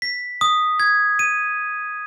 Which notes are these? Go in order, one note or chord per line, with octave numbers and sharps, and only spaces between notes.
B6
D#6
G#6
D#7